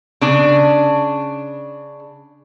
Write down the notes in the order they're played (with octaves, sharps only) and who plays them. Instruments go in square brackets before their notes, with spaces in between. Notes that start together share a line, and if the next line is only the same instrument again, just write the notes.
[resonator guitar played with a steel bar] C#3 D4